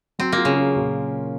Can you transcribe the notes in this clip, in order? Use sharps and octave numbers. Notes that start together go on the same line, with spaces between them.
F#3 C4
A#3
F4
C#3
C#4
A#2